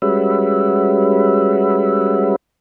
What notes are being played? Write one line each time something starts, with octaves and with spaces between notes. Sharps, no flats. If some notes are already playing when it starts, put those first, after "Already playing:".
G3 G#3 C#4 F#4 B4 E5